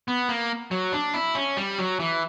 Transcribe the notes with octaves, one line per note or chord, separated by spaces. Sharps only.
B3
A#3
F#3
D4
E4
C#4
G3
F#3
E3